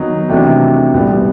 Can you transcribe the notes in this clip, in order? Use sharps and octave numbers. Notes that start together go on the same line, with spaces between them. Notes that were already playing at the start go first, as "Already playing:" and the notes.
Already playing: D#3 F#3 B3 D#4
C3 E3 A3 D4 F#4
C2 A#2 G3 B3